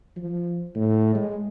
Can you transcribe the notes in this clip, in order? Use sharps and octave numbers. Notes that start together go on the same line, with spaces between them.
F3
A2
G#3